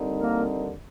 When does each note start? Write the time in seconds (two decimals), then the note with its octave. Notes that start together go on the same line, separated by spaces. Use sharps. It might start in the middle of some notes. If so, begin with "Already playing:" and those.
Already playing: D#2 D3 G3 C4 D#4
0.18 A#3 A#4